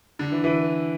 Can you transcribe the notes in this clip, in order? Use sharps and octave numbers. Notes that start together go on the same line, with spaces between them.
D3
E3
E3